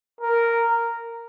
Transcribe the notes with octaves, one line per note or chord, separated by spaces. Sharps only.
A#4